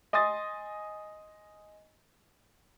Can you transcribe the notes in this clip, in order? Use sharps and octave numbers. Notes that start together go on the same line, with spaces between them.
D#5 G#5 C6 D#6 A6